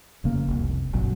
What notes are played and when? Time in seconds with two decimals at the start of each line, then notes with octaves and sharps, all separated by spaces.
0.24 F1 C#3 A#3
0.48 F1 C2
0.93 F#1 B1 A#2 F#3